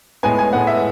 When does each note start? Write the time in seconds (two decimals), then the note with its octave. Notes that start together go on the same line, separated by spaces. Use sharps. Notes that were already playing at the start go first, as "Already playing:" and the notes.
0.23 A2 G#3 B3 G#5
0.38 G#5
0.53 A2 G#3 B3 F#5
0.67 E5